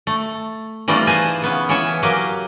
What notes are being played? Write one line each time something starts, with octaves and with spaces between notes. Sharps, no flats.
A3
E3 G3 A3 C4 D#4 F4
G#4 B4 C5 G#5 A#5
C#3 B3 C#4
E3 C#4 C#5 E5 A5
F#3 A#3 G4 G#5